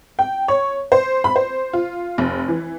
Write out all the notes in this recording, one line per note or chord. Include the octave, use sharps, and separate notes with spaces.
G5
C#5
C5
B5
C5
F4
F1
E3